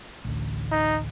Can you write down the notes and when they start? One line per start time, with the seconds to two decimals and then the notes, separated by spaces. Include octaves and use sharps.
0.25 A1 D2
0.72 D#4